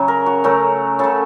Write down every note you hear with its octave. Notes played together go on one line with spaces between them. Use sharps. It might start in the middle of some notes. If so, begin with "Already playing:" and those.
Already playing: C#3 F#3
A#4
F#4
C#3 F#3 A3 A#4
C#3 A3 A4